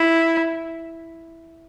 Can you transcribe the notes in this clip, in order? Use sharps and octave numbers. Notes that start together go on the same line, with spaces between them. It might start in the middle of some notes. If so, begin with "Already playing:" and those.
Already playing: E4